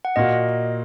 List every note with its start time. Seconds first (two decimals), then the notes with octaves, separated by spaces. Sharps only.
0.05 F#5
0.16 A#2 A#3 F#4 D#5